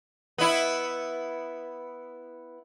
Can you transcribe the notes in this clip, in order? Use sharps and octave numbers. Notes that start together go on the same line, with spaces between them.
B3 E4